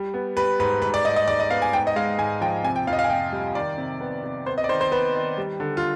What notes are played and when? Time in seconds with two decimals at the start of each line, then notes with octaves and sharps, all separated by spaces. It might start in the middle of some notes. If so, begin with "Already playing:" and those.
Already playing: G3
0.14 B3
0.37 G3 B4
0.60 G#2 B4
0.82 G#2 B4
0.94 D5
1.05 G#2 D#5
1.16 D#5
1.28 G#2 D5
1.40 D#5
1.51 B3 F5
1.62 G#5
1.73 G#2 G5
1.87 D#5
1.96 G#3 F5
2.19 G#2 G#5
2.41 F3 G5
2.64 C3 G#5
2.76 G5
2.87 F2 F5
2.93 D#5
2.99 F5
3.04 G#5
3.10 C3 G5
3.32 G3
3.55 D#3 D5
3.78 C3
4.01 B3
4.24 C3
4.46 B3 C5
4.58 D#5
4.64 D5
4.69 D#3 C5
4.81 C5
4.91 B3 B4
5.15 D#3
5.38 G3
5.60 D3
5.77 F4